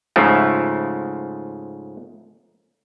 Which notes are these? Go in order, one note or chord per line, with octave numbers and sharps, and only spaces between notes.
G#2 C#3 F3 A3